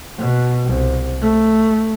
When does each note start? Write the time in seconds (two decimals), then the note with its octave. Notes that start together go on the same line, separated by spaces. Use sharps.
0.18 B2
0.65 C2
1.22 A3